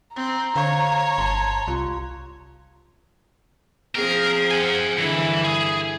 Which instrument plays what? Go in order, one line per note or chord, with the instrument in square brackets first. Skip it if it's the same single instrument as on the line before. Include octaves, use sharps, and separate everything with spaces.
[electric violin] C4 [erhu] A#5
[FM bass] D3 [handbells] C5 F5 C#6 [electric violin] C#5
[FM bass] G1 [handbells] A5 C6
[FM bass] C2 [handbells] F4
[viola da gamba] F3 C4 G#4 [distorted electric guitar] A#4
[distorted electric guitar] F#5 G#5
[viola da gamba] G2 D3 E4 [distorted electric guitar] E3
[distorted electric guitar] G#4